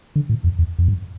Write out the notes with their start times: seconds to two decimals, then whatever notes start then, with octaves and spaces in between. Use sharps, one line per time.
0.16 D3
0.29 A2
0.44 F2
0.59 E2
0.79 F2
0.88 G2